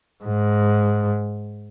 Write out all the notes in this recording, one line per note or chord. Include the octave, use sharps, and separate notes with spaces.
G#2